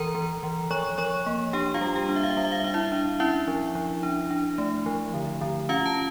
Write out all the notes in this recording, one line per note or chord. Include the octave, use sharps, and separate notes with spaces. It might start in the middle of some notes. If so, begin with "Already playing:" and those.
Already playing: E3 A#4 A#5
E3
E3
F3 C#5 C#6
F3 C#5 C#6
A#3
D4 G4 G5
F4 F5
G3
G4 G5
D4
E5
F5
E5
G3 F5
E5
F5
E5
D4 F5
E4 E5
D4
C#4 E4 E5
F3
F3
D4
D4
A3
F3
D3
D3
C#4 F4 F5
A5